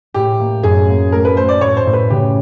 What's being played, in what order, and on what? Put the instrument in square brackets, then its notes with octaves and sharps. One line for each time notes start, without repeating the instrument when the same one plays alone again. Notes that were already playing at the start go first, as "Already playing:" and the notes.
[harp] A2 [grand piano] G4
[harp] A#3
[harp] F#2 [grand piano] G#4
[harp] A#3
[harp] A3 [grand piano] A#4
[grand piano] B4
[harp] A3 [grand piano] C5
[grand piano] D5
[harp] A2 [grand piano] C#5
[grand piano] C5
[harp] A2
[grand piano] B4
[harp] C#3 [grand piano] G4